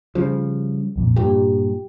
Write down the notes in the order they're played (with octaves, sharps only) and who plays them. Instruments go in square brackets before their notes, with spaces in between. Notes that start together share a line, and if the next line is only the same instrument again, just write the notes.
[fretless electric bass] C#3 F3 [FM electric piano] G3
[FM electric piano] C2 F2 A#2
[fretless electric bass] G2 A#2 [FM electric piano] G4